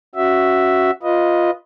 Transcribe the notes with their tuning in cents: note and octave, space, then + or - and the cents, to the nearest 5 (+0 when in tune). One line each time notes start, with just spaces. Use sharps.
C#4 +0 F#4 +0 E5 +0
F4 +0 B4 -15 D#5 +0